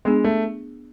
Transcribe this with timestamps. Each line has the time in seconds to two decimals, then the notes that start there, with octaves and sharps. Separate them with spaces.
0.05 G#3 B3 D4 G#4
0.24 A3